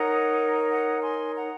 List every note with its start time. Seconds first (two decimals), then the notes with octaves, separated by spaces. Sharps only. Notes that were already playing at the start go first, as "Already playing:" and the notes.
Already playing: D#4 A#4 C#5 F#5 A#5
0.69 F#5 A#5
1.02 G#5 C6
1.35 F#5 A#5